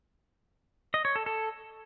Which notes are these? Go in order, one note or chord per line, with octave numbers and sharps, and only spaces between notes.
D#5
C#5
A4
A4